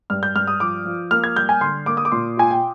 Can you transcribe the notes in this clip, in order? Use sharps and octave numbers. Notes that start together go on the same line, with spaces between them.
G2 F6
G6
G2 F6
D#6
F3 D6
F3
A#3 F6
G#6
G3 G6
G#5
D3 C6
A#3 D6
D#6
D6
A#2 C6
F4 G#5
G5